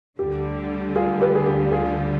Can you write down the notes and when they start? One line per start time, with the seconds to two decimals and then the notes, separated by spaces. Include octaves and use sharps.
0.19 D2 D3 G3 G4
0.95 F4 G#4
1.21 G4 B4
1.35 G#4
1.46 G4
1.72 F4 G#4